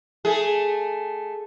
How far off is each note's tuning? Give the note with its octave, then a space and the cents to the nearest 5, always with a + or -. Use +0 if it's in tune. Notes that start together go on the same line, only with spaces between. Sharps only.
A3 +0 G#4 +0